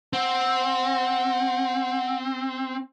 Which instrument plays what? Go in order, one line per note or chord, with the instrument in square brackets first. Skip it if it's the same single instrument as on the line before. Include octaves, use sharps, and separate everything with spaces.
[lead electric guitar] C4 [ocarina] F#5